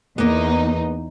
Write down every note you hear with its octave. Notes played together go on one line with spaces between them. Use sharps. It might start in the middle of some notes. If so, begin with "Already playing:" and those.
E2 A#3 B3 D#4